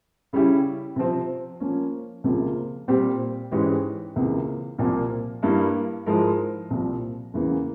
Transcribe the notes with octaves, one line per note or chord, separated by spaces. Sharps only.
C#3 G3 C#4 E4 G4
C3 F3 C4
F3 A#3 C#4
C#2 C3 F3 A#3 F4
A#2 G3 C4 G4
G#2 E3 G#3 C#4 G4
C#2 C3 E3 A#3
C2 A#2 F3 A#3
G2 G3 A#3 E4
G#2 F3 G#3 E4 A#4
C2 A#2 F3
E2 C#3 E3 A#3